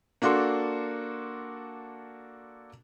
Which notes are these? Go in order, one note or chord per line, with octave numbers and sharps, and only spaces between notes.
A#3 D4 F#4 A4 C6